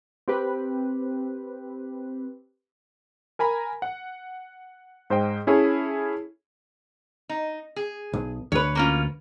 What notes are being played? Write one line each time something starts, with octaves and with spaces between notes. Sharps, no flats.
C4 G4 B4
A#4 G#5 A#5 B5
F#5
G#2 C5 D#5 G5
C#4 E4 G#4 A4 C#5
D#4
G#4
B1
D2 B4 C#5
A#3 C#4 F4